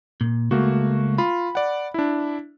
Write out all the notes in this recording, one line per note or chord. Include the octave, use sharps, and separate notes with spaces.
A#2
C#2 A3 A#3 F#4
F4 B5
D5 F#5
D4 E4